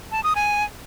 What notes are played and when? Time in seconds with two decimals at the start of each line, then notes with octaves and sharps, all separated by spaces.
0.12 A5
0.24 D#6
0.36 G#5